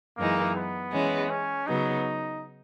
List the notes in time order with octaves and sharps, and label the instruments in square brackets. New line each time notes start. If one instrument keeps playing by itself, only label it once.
[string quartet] F#2 E3 G#3 D#4 [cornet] A#3
[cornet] B3
[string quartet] E3 G#3 C#4
[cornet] C#4
[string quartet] C#3 F#3 B3 [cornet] D#4